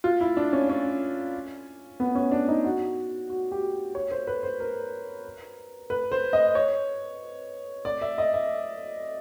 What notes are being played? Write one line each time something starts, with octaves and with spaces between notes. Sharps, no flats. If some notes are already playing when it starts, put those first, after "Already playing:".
F4
E4
D4
C#4
C#4
B3
C#4
D4
D#4
F#4
F#4
G4
C#5
C5
B4
C5
A#4
B4
C5
D#5
C#5
D5
E5
D#5
E5